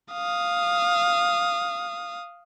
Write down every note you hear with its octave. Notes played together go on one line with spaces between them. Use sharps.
F5 D#6